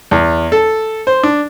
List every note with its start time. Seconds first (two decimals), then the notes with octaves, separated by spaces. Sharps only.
0.11 E2
0.52 A4
1.07 C5
1.23 D4